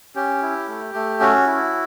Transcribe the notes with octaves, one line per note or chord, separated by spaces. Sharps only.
C#4 G4
E4
A3
A3
C#4 F#4
E4